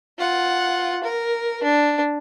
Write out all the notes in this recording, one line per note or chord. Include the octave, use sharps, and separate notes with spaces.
F4 F#5
A#4
D4